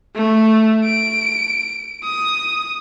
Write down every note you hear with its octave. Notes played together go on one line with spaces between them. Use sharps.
A3
D7
D#6